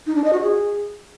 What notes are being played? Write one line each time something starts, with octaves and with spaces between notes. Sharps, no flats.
D#4
D4
D#5
F#4
G#4